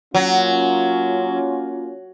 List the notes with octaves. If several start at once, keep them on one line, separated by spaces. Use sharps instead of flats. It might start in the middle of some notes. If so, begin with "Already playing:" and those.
F#3 A#3 C#4 F4